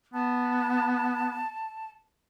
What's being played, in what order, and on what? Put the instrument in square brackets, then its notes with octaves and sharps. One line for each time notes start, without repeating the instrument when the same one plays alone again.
[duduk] B3 [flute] A5